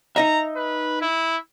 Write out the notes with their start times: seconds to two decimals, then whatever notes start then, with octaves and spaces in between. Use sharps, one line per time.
0.16 D#4 D#5 E5 A#5
0.56 B4
1.01 E4